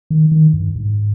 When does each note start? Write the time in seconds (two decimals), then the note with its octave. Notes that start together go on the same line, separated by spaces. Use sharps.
0.10 D#3
0.32 D#3
0.54 G2
0.76 G#2